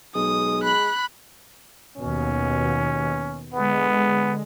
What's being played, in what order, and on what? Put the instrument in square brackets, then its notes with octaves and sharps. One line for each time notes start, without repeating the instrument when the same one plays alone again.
[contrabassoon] B1 [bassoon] G#3 [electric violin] D#6
[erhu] B5 [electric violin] F#6
[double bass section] D#2 B2 [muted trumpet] C#4
[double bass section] D3 G#3 [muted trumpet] B3